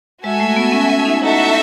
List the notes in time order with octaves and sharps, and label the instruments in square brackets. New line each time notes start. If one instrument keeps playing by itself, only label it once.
[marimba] G#3 [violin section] F#4 A4 E5 G#5
[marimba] A3
B3
C#4
C#4
C#4
D#4
[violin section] D#4 F#4 A4 E5 [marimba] E4
[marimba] E4